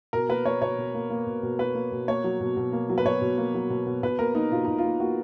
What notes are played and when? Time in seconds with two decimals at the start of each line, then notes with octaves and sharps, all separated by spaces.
0.13 B2 A#4
0.29 A#3 B4
0.46 A#3 C#5
0.61 B2 C#5
0.79 B2
0.94 A#3
1.10 A#3
1.27 B2
1.43 B2
1.59 A#3 B4
1.75 A#3
1.92 B2
2.08 A#3 C#5
2.24 F#3
2.41 B2
2.57 B2
2.73 A#3
2.90 F#3
2.98 B4
3.05 B2 C#5
3.22 B2
3.38 A#3
3.54 F#3
3.70 B2
3.87 B2
4.03 B2 B4
4.19 A#3 A#4
4.35 A#3 D#4
4.52 B2 F4
4.65 B2 D#4
4.78 F4
4.84 A#3
5.00 A#3 F#4